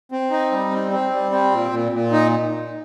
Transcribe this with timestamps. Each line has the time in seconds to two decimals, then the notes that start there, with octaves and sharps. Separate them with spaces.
0.12 C4
0.31 D#4
0.52 G3
0.72 C4
0.91 C4
1.11 G3
1.32 C4
1.51 A#2
1.71 A#2
1.92 A#2
2.12 D#4